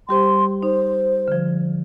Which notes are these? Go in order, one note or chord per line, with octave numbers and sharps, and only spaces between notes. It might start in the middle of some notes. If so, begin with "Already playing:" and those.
G3 G4 C5 C6
D#4 C5
D3 F3